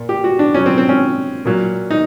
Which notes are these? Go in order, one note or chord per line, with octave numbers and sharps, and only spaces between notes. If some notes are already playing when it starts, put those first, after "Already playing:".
Already playing: A#2
G4
F#4
D4
D3 F#3 C#4
C4
C4
C#4
A#2 F#3
D#4